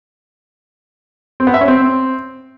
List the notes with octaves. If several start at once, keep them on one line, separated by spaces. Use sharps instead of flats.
C4
B3
E5
C#4
C4